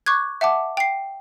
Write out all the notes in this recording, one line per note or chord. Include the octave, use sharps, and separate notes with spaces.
C#6 D6 F#6 G#6
E5 F#5 A5 D6
G5 C7